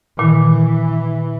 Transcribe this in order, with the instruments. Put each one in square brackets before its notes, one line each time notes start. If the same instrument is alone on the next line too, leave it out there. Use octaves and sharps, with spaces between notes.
[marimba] A#2 D#3 [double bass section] E3